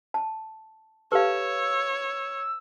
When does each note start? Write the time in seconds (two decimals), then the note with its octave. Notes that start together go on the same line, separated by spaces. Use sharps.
0.14 A5
1.12 G4 A4 B4 C#5 F5 A5 E6